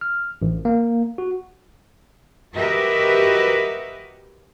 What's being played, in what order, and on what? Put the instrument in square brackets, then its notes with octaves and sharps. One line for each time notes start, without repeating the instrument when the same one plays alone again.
[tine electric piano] F6
A1
A#3
F#4
[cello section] F#4 G4 A#4 B4 D#5 E5